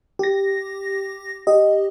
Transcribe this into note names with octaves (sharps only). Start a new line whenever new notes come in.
G4 A#6
G4 D#5